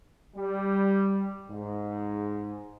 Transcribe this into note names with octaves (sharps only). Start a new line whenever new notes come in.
G3
G#2